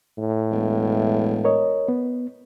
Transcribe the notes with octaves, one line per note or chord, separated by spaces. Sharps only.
A2
E1
A#4 C#5 D#5
B3